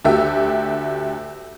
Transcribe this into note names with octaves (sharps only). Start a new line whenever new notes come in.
D2 F#4 G4 E5